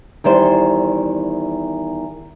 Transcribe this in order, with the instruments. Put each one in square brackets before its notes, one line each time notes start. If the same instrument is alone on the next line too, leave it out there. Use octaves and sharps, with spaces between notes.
[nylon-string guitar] E2 D#3 G3 C5